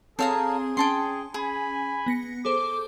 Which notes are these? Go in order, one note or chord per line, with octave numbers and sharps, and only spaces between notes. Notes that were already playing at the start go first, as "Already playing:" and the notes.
C4 G#4 A4 C#5 F5 A#5 C6
C#4 G5 A5 C6
G#4 G#5 B5
B3 A#6 C#7
G#4 A4 C5 D6